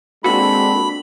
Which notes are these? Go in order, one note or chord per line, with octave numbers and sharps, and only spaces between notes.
G#3 A#3 C4 D4 F#4 A4 B5